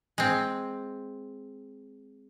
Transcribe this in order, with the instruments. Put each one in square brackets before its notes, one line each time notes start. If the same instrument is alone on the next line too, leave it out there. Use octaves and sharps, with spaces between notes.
[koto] G#3 C4